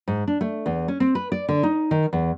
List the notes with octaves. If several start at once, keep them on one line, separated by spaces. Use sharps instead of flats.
G#2
D4
A3
E2
C#4
C4
B4
D5
D3
D#4
D#3
E2